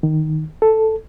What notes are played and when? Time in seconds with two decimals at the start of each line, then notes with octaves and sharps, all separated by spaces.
0.03 D#3
0.62 A4